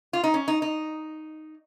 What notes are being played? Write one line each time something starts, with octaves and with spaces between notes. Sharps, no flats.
F4
D#4
C#4
D#4
D#4